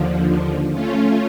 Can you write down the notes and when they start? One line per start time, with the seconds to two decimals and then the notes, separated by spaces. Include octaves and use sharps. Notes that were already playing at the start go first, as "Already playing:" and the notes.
Already playing: D#2 D3 F3
0.71 A3 C#4 F4